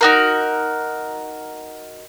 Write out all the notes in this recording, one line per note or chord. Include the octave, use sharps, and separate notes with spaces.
D#4 F#4 A#4